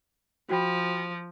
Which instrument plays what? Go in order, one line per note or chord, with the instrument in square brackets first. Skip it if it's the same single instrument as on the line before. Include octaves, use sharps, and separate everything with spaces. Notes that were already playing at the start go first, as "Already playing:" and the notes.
[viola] F3 [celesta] F#4 G5 B5